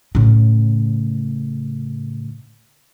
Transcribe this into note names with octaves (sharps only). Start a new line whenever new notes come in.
A2 C#3